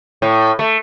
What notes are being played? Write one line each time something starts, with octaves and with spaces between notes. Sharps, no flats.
A2
A3